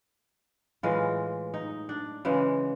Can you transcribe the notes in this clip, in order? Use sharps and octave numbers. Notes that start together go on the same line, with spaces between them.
A2 E3 G#3 F4
D#4
D4
C#3 E3 G#3